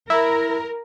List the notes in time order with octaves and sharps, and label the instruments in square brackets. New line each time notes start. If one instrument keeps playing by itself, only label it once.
[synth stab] E4 [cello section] A#4